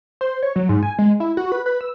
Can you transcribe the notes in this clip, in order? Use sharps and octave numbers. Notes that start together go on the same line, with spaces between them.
C5
C#5
F#3
G#2
G#5
G#3
E4
F#4
B4
B4
E6